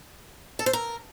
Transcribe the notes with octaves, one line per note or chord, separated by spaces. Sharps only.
A4
C5
A#4